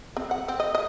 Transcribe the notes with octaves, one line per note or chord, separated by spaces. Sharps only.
C4
F#5
C4
D#5
D#5